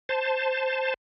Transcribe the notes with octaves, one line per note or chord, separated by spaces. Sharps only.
C5 A5